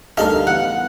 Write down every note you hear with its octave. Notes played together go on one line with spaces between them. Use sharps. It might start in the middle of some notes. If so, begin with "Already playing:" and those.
D2 G3 B3 D#4 A4 A#4 F5
E3 B3 F#5